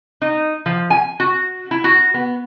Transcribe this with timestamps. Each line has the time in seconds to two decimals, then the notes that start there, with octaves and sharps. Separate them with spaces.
0.22 D#4
0.66 F3
0.90 G#5
1.20 F#4
1.71 E4
1.84 F#4
2.14 B3